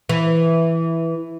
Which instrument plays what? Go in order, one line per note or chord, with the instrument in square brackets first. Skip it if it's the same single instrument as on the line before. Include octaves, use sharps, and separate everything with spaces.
[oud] E3